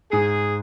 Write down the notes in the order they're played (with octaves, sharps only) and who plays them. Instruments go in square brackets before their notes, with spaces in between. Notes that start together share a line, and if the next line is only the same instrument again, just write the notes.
[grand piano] G#2 [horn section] G#4